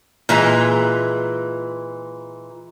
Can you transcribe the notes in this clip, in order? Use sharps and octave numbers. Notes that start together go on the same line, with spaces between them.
A#2 E3 G#3 A#5